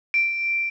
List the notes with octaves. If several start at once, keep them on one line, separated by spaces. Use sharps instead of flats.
D7